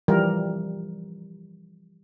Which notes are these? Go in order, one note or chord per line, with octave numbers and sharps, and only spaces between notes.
E3 F3 G3 A#4